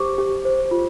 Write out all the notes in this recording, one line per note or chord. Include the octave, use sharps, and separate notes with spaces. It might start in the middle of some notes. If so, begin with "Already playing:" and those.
Already playing: G4 C5 C#6 D6
G4
C5
F4